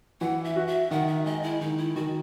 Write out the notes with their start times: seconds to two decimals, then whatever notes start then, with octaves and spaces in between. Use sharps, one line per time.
0.21 E3 F#5
0.45 E5
0.56 F#4
0.67 E5
0.91 D#3 F#5
1.07 E5
1.25 G#3 D#5
1.43 E4
1.61 D#3 D#4
1.78 E4
1.96 D#3 F#4